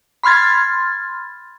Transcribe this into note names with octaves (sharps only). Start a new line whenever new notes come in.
B5 C6 F6 G#6 A6